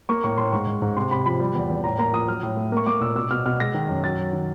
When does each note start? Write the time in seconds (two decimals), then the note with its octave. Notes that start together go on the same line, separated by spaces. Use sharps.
0.09 A#3 C#6
0.24 A2 C#6
0.38 A2 C6
0.52 G#2 C#6
0.67 G#2
0.82 G#2
0.97 C3 C6
1.11 C3 B5
1.26 F3 B5
1.40 G3
1.55 E2
1.69 E2
1.84 A2 A#5
1.98 A#3 A#5
2.13 F3 D#6
2.27 F#3 F6
2.43 A2
2.57 A3
2.72 A#3 C#6
2.87 A#3 D6
3.01 A#2 E6
3.15 B2 E6
3.30 B2 F6
3.46 B2 F6
3.60 G#3 A#6
3.74 D#3
3.89 F#2
4.04 F#3 A6
4.18 F#3
4.33 D#3